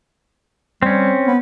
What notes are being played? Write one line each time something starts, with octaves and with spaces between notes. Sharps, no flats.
G3 C4 C#4
B3